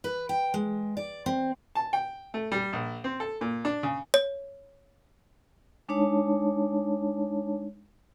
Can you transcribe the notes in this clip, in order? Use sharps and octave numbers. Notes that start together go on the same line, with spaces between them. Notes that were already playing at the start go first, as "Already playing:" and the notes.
B4
G5
G#3
D5
C4
A5
G5
A3
G3
A#1
C4
A4
A#2
D4
C#3
C#5
G#3 D4 D#4 C#5 A5